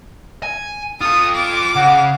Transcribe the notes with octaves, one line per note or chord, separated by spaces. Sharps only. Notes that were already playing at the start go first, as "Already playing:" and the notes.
G#5
F4 A4 D#6
D6
C#3 F#5